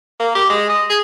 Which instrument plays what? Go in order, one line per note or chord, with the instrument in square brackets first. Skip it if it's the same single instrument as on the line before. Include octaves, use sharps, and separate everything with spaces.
[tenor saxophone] A#3
G4
G#3
D#5
G#4